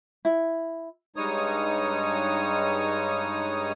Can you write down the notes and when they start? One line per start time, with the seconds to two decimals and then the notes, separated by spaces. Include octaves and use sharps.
0.25 E4
1.16 G2 G3 G#3 D#4 C#5 D#6